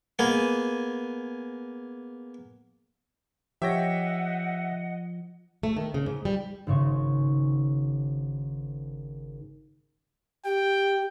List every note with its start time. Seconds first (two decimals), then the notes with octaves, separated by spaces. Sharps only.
0.19 A#3 B3 G#4 D#5
3.62 F3 G4 C#5 D#5 E5 F#5 G5 A#6
5.63 A3
5.77 D#3
5.94 C#3
6.06 G#2
6.25 G3
6.67 G#1 G#2 C#3 C#6
10.45 G4 G5